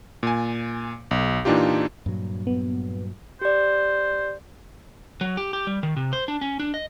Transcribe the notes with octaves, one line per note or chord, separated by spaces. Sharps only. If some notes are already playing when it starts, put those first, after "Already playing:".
A#2 G#5
B1
A#2 E3 D4 D#4 F4 G4
G2 A#2 F#3
B3
G4 C5 D5
F#3
G4
G4
G3
D#3
C3
C5
D4
C#4
D4
D#5